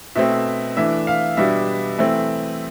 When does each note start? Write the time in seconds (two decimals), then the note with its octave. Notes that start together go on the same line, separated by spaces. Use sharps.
0.15 B2 A3 C4 E5
0.77 E3 A3 D4 E5
1.07 F5
1.37 B2 G3 D4 E5
1.98 E3 A3 C4